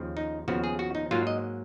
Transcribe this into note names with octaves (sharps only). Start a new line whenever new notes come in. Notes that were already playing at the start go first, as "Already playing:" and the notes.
Already playing: D#2 C#3 F3
D#4
D#2 C#3 F3 B3 F#4
G#4
F#4
D#4
G#2 F#3 A#3 F4
D#5